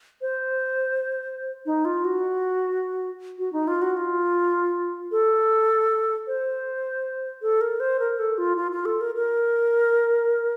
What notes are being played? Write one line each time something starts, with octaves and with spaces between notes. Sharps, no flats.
C5
D#4
F4
F#4
F#4
D#4
F4
F#4
F4
A4
C5
A4
A#4
C5
A#4
A4
F4
F4
F4
A4
A#4
A#4